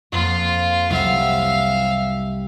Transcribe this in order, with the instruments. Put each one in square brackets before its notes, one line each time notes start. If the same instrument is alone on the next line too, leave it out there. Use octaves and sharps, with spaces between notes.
[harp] F2 A#3 [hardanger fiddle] F4
[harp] C2 F#3 [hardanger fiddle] E5 F5